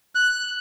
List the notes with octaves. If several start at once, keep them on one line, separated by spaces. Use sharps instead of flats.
F#6